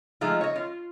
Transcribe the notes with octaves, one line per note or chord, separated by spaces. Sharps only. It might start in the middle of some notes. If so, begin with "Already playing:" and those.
F3 G#3 A3 D#4 F4
C#5 D#5
F4